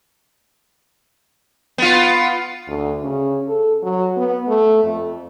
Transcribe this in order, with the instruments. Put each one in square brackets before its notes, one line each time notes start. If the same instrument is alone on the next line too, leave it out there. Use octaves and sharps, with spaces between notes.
[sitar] B3 F4
[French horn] D2
C#3
A4
F#3
B3
A3
F2